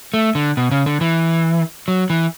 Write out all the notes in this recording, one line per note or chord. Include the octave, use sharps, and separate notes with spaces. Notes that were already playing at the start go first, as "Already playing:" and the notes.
A3
D3
B2
C#3
D3
E3
F#3
E3